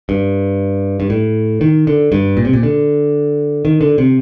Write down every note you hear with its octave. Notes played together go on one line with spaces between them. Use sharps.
G2
G2
A2
D#3
D3
G2
A#2
C3
A#2
D3
D#3
D3
C3